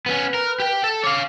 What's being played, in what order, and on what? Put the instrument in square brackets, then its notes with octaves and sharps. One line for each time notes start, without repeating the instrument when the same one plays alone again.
[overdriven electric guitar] B3 C#4 [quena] B4
[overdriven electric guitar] A#4
G4 G5
A4
[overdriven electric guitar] C#5 F5 [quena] D6